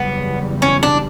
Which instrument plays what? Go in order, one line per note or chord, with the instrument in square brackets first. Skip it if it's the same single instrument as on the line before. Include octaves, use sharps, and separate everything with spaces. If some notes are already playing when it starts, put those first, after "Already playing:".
Already playing: [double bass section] F#1 E2 C#3 G3 [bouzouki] B3
[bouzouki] C#4
D4